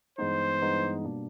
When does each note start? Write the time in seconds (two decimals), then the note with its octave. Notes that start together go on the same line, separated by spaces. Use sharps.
0.18 G2 E3 G#3 B3 D#4 C5
0.62 G2 E3 G#3 B3 D#4
1.05 B2 G3 A#3 D4